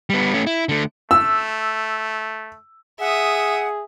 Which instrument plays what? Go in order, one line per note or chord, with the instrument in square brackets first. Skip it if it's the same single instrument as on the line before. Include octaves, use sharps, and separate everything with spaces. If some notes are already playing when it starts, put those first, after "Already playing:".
[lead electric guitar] G3 B3
A3 C#4
E4
D3 A3
[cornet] A3 [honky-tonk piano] E6
[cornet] G#4 [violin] E5 D#6 [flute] F#5